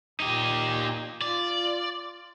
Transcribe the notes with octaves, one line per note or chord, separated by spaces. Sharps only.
A#2 D#4 G4
F4 D5